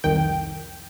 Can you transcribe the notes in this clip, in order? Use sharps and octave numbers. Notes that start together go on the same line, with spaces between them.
C2 F2 D#3 G5